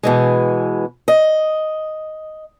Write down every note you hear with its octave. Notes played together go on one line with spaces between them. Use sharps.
B2 E3 G#3
D#5